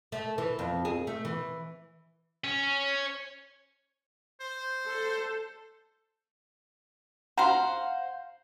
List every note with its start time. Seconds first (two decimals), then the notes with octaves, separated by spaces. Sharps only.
0.12 A3
0.38 E3
0.59 F2
0.85 G#4
1.07 A3
1.25 E3
2.44 C#4
4.40 C5
4.86 A4
7.37 C5 F5 F#5 A#5